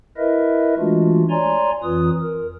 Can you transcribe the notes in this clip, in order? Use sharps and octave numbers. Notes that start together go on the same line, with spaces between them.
E4 A#4 B4 D#5 E5
E3 G#3 A3 D4 F4 F#4
C#5 D5 G#5 A#5 C6
F2 E3 F4 B4 D#6
A#4